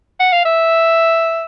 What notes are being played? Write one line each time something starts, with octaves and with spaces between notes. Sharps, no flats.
F#5
F5
E5